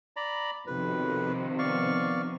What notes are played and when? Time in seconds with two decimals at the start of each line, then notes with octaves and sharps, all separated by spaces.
0.16 D5 A#5 B5
0.67 B1 F2 C3 D#3 F3 B4
1.59 B3 D5 F5 C#6